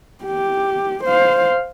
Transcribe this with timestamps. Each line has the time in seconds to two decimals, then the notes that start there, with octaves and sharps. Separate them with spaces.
0.24 G4
1.03 C5 F5